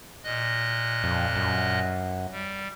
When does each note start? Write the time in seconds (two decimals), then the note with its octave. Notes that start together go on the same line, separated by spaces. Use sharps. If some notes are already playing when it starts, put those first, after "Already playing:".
0.24 A#2 D#5 F#6
1.04 F2
1.36 F#2
2.31 G3